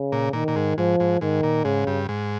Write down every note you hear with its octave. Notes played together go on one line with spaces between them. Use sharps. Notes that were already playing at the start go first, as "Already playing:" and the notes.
Already playing: C#3
A#2
A#2 D#3
A#2
G#2
G#2 F3
G#2
G#2 D#3
A#2
G#2 C#3
G2
G#2